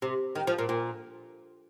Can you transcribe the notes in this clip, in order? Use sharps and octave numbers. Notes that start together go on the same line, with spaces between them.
C3
D#3
F3
A#2
A#2